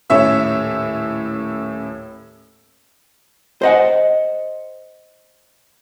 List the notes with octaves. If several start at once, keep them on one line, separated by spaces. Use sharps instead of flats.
D#1 A2 C#4 C#5 E5 E6
C5 D#5 F#5